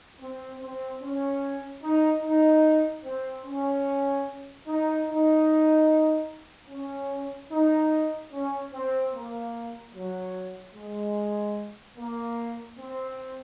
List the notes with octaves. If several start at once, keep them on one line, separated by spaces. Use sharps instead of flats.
C4
C4
C#4
D#4
D#4
C4
C#4
D#4
D#4
C#4
D#4
C#4
C4
A#3
F#3
G#3
A#3
C4